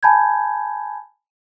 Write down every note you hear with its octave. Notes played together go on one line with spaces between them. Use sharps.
G#5 A5 B5 G6 G#6